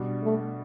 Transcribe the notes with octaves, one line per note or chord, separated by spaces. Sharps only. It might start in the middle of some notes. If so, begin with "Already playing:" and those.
Already playing: B2 G3 D4
A3